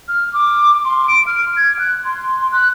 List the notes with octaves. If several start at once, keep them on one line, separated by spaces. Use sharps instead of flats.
F6
D6
C6
D7
F6
G#6
F#6
C6
F#6